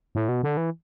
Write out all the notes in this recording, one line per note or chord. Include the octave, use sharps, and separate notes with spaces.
A2
B2
D3
E3